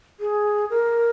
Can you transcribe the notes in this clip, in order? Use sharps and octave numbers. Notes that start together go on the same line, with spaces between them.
G#4
A#4